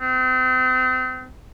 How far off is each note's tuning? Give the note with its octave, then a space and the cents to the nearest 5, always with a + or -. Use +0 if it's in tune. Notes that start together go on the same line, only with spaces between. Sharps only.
C4 -35